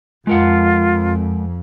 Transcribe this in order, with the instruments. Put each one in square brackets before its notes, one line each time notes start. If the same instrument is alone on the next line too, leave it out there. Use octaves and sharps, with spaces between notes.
[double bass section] F2 [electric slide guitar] G#3 A#4 F#5 [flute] F4